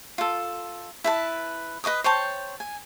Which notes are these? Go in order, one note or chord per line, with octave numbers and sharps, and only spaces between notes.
F4 A4
E4 B4 A5
B4 D#5 D6 D#6
C5 C#5 G5 A5
G#5